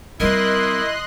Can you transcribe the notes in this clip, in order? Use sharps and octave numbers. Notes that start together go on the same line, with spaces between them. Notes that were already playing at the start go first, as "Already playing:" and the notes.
G3 C4 E4 A#4 D#5 C6 F#6